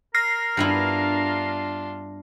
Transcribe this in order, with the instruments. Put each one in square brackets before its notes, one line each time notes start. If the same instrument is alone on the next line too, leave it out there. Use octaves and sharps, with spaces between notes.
[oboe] A#4 [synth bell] F6 A#6 C7
[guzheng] G2 B3 E4 [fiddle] D4 F4